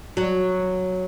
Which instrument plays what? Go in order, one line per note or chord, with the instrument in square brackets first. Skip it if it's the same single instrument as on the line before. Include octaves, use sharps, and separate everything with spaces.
[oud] F#3